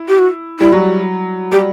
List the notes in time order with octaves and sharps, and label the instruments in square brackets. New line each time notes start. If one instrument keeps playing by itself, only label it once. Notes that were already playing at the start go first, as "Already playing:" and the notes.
Already playing: [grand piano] E4
[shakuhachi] G4
F#4
[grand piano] G3 [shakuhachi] E4
[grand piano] F#3 [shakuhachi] F#4
[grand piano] G3 [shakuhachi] G4